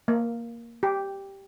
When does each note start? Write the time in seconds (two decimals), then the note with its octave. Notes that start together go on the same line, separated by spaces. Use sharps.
0.08 A#3
0.83 G4